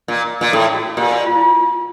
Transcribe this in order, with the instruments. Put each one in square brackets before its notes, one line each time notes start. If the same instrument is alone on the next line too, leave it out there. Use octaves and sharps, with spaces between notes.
[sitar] A#2
A#2
[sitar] A2 [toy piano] A4
[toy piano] F#4
[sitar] A#2 [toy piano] G4
[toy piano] F#4
F4
E4
F4